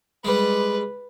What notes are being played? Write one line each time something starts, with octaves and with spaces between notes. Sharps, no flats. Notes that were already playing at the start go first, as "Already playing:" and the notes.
G3 G#3 B4